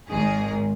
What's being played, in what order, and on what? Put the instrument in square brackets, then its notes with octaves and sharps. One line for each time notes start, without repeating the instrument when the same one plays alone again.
[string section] G#1 G#2 D#3 G#4